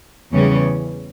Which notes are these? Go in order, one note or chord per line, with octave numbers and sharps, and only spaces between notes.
E2 C#3 E3 G3 C#4